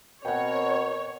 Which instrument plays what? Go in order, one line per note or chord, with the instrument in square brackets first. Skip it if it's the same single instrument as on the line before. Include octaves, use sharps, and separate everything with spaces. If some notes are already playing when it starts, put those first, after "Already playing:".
[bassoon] B2 [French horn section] C4 A#4 [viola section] C#5 [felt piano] F#5 G5